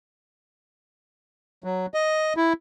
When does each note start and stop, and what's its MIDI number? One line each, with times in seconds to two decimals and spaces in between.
1.64 1.86 54
1.94 2.33 75
2.37 2.53 64